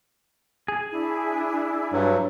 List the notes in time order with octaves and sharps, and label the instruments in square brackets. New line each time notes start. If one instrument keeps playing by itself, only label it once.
[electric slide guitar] G#4
[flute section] D4 E4
[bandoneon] G2 F#3